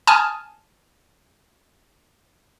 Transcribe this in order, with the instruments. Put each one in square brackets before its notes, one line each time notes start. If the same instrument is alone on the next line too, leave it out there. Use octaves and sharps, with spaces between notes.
[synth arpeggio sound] G#5 A5 D#6 F6